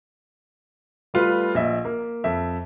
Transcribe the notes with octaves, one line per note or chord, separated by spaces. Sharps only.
G3 A3 F4 B4
A#1 D#5 E5
A#3
F2 E5